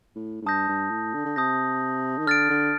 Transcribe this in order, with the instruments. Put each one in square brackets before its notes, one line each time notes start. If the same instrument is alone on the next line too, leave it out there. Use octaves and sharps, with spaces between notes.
[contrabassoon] A2
A2
[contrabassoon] G2 [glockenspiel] A5 D#6 G6 A#6
[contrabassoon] G2
A2
D3
D3
[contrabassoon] C3 [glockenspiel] A5 D#6 G6 A#6
[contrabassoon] D#3
[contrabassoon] D3 [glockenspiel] F6 A6 D7
[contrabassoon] D3